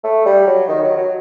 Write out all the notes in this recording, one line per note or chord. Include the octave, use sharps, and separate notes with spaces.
A3
G3
F#3
D#3
F#3
F#3